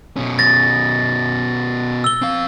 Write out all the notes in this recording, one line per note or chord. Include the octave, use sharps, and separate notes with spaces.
B2 C#4
A6 A#6
E6 G7
C4 F5